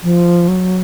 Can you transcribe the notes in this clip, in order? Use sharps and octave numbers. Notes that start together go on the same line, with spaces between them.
F3
F#3